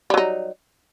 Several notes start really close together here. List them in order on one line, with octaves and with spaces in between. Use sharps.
G3 F#3 D#4